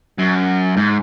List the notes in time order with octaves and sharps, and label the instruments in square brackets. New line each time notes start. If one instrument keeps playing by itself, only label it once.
[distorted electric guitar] F#2
G#2